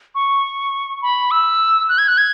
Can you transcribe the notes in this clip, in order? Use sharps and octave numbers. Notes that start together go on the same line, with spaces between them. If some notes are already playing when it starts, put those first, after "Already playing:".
C#6
B5
E6
F#6
G#6
F#6
G#6